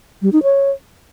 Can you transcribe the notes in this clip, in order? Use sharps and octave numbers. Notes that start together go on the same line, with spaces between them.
G3
D#4
C#5